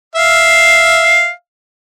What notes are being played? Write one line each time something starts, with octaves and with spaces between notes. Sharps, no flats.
E5 F5